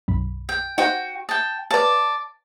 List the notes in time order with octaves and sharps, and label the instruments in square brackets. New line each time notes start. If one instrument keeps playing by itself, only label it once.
[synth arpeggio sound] B1 F#2 B5
[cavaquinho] G5
[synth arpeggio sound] D#4 C5 F#5 [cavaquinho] F#4 G5
[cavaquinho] G5 A5 [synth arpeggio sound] D#6
[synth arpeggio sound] B4 C#5 F5 [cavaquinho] D5 A5